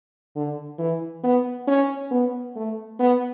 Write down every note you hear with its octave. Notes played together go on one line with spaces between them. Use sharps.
D3
E3
B3
C#4
B3
A3
B3